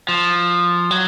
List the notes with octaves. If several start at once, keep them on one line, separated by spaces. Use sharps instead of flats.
F3
F#3